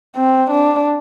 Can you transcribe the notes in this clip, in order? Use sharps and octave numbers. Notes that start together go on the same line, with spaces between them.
C4
D4